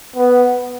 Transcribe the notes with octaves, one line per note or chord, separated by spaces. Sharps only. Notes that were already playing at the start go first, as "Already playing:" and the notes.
B3